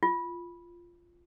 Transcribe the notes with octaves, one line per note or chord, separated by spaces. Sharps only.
F4